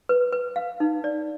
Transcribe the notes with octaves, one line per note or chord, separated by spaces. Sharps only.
B4
B4
F5
D#4
D5